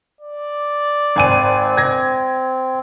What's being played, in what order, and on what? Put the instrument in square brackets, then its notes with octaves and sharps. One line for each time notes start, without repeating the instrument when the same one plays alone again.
[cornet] D5
[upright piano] G#1 G#5 D#7 [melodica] C4
[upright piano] G#6 A#6